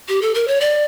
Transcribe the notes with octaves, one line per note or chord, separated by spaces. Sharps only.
G4
A4
A#4
C#5
D5